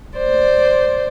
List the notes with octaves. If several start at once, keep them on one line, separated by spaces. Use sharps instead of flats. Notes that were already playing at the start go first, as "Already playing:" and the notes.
C5 D5